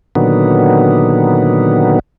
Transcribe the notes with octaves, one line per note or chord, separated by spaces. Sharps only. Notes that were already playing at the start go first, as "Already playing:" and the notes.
A#2 D3 D#3 F#3 B3